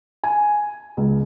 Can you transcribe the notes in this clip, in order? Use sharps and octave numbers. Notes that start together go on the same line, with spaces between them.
G#5
C#2